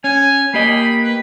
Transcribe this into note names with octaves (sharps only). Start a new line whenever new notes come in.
C#4 G#5
A#3 G4 D#5 B5
B4